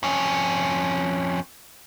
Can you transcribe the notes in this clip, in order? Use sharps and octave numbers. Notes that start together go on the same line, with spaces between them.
F2 C#4